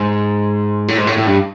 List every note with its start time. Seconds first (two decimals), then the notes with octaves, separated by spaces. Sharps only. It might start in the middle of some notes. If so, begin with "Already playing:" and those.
Already playing: G#2
0.88 A2
0.97 G#2
1.07 A2
1.18 A2
1.27 G2